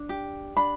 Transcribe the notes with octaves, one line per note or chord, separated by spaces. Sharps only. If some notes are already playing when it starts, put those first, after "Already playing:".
Already playing: D4
G4
D4 B5